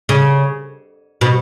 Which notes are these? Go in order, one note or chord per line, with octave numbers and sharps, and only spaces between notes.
C#3
B2